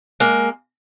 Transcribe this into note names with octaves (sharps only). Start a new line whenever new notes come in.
G#3 A#3